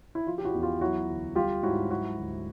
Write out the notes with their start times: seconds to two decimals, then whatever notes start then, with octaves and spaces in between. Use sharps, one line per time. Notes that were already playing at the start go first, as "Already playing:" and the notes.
0.15 E4
0.26 F3 F4
0.38 G4
0.45 E4 F#4
0.54 E2
0.63 F4 G4
0.81 F#3 E4 F#4
1.08 D2
1.35 G3 F4 G4
1.63 G#2 E4 F#4
1.90 F#3 E4 F#4
2.18 D2